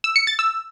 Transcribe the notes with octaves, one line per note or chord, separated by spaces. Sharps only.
E6
C#7
A6
E6